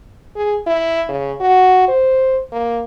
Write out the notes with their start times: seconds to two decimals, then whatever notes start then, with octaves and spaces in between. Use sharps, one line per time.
0.36 G#4
0.67 E4
1.09 C#3
1.41 F#4
1.88 C5
2.52 A#3